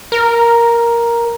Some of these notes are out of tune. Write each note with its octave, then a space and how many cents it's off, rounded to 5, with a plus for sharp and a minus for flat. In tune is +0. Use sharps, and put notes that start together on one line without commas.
A#4 +5